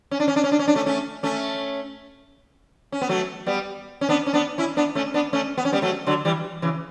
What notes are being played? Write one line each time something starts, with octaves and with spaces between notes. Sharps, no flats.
C#4
D4
C#4
D4
C#4
D4
C#4
D4
A3 C#4
A3 C#4
A3 C#4
C#4
B3
F#3 A3
G3 B3
C#4
B3 D4
C#4
B3 D4
C#4 E4
B3 D4
A3 C#4
B3 D4
A3 C#4
B3
C#4
G3 B3
F#3 A3
D3 F#3
E3 G3
C#3 E3